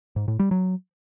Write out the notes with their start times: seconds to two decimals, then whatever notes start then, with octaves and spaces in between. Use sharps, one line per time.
0.16 G#2
0.28 A2
0.39 G3
0.51 F#3